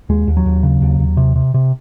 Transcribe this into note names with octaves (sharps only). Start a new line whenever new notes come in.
D#2 G#3
D#2
F#3
D#2
C#3
D#2
D#2
C3
C3
C3